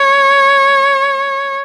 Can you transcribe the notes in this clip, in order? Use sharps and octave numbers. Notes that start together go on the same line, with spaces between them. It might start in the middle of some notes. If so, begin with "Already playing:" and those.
Already playing: C#5